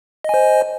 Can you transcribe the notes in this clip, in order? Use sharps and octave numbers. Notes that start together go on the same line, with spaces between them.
C5 D#5 G#5